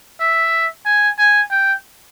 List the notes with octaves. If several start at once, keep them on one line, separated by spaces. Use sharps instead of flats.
E5
G#5
G#5
G5